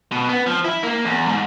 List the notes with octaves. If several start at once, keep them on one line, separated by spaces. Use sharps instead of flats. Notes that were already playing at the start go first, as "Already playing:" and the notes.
B2
B3
F3
E4
A#3
E2
G#2